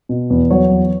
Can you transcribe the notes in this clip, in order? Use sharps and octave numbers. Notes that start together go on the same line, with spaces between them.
B2
E2
F#3 C#5
E2